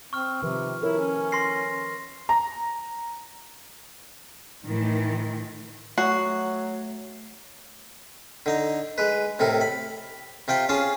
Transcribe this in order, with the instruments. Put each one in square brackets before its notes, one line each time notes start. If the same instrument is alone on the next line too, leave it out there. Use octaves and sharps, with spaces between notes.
[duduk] C4 [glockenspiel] C#6 F6
[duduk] C3 [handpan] D#3 F3 B4
[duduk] E4 [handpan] A4 A#4 C#5
[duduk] C#4
[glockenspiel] C6 A#6 C7
[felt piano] A#5
[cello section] A2 D#3 E3
[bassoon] F#3 [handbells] A3 C7 [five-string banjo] F#4
[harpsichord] D3 D#4 A#5
G#3 B4
A2 C3 A4 A#4
B5
C3 F4 G5 B5
C#4 F4 G#4 A5